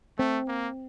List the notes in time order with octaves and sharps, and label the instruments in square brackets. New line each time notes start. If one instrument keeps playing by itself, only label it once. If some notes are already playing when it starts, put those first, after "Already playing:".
[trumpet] A3 [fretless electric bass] C4
[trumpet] A#3